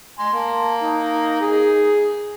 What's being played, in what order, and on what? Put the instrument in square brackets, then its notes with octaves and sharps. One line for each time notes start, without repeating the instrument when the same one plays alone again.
[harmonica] G#5 C6
[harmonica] A#3 [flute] A5
[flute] D#4
[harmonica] G#4